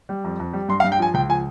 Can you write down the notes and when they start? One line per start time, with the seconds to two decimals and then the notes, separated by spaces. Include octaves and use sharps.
0.09 G3
0.24 F2
0.40 F2
0.53 G3
0.68 G2 C6
0.80 F5
0.84 G2
0.92 G5
0.99 F3 G#5
1.14 C#2 G5
1.29 F3 G#5